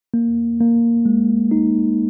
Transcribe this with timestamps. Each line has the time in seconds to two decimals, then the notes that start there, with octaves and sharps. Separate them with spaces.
0.14 A#3
0.60 A#3
1.05 G#3
1.51 D#4